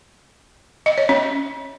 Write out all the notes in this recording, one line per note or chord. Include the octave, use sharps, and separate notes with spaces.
D#5
C#5
C#4